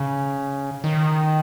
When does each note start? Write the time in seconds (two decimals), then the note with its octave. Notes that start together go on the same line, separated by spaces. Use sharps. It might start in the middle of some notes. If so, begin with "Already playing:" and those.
Already playing: C#3
0.84 D#3